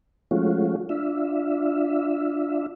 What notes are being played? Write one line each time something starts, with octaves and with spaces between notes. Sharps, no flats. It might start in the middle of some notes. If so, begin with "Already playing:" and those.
F3 G#3 A3 C#4 F4 F#4
D4 F4 E5